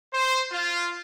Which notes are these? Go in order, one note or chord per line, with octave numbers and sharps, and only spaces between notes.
C5
F4